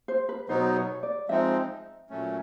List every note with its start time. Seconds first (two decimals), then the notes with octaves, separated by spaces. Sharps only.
0.08 C5
0.29 B4
0.49 B2 F#3 B3 D#4 C5
0.76 C#5
1.03 D5
1.29 F3 G#3 C4 D#4 E5
2.10 A#2 F#3 A3 C#4